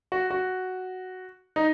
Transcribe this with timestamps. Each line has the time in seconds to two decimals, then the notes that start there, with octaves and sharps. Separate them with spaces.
0.12 F#4
0.31 F#4
1.56 D#4